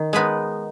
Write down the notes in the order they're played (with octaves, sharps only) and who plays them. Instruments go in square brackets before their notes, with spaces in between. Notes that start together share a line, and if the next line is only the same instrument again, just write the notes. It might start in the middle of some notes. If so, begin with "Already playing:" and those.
Already playing: [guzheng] D#3
G#3 B3 D#4 B4 B5